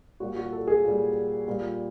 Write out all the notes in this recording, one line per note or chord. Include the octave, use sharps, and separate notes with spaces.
A#2 G3 F#4
F#4
A4
G#4
A#2 G3
A#2 G3